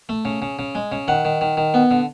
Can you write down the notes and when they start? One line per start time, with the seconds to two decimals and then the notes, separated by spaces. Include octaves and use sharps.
0.09 A3
0.25 C#3
0.42 C#3
0.59 C#3
0.75 G#3
0.92 C#3
1.08 D#3 F#5
1.25 D#3
1.41 D#3
1.57 D#3
1.74 B3
1.91 D3